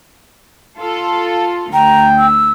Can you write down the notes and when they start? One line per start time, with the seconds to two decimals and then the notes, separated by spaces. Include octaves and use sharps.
0.78 F4 A4
1.73 D2 G5 A#5
2.18 E6